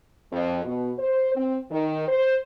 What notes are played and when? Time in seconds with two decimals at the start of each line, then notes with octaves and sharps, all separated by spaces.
0.32 F2
0.64 B2
0.98 C5
1.35 C4
1.71 D#3
2.08 C5